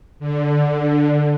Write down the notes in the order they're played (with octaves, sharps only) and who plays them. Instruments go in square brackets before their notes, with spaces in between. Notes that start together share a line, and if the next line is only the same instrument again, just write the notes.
[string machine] D3